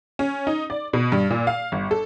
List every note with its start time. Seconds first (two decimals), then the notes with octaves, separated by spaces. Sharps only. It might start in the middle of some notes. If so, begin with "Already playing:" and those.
0.19 C#4
0.47 D#4
0.70 D5
0.93 B2
1.12 G2
1.30 A#2
1.47 F5
1.72 G1
1.91 A4